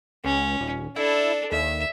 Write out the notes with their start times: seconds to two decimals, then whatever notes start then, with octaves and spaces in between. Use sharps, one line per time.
0.25 C#2 C#4
0.60 D#1
0.96 D4 E4 A4
1.52 D#2 E5